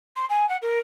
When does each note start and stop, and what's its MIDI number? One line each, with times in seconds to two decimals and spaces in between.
0.16 0.25 84
0.29 0.48 80
0.49 0.57 78
0.61 0.78 70